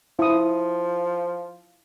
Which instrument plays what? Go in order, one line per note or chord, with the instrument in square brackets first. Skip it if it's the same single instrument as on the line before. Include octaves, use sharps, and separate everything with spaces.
[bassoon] F3 [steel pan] E4 D#6